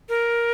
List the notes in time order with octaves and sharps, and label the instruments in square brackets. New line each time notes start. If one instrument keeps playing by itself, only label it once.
[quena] A#4